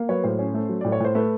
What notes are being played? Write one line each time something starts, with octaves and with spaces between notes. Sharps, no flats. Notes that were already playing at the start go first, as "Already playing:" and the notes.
Already playing: A#3
F#3 B4 C#5
A2 C5
C#4
A3
F#3
A2 D5
C#5
A2 C5
A3 B4